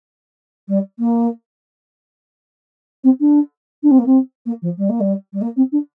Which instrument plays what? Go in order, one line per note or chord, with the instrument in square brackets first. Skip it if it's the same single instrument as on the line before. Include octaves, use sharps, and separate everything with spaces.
[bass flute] G3
A#3
C4
D4
D4
C4
A#3
C4
A#3
F3
G3
A#3
G3
G3
A#3
C4
D4